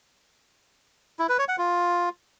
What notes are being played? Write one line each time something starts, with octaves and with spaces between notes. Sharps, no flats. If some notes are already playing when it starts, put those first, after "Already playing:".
E4
B4
C#5
F#5
F4